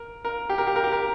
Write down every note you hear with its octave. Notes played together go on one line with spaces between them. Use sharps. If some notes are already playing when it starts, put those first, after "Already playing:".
Already playing: A#4
A#4
G4
A#4
G4
A#4
G4
A#4